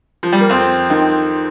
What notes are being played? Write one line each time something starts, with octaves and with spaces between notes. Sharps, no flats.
F3
G3
A#3
F2 C4
D#3